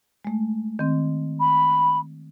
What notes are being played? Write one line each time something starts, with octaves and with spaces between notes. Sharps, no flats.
G#3 A3
D#3 C4
B5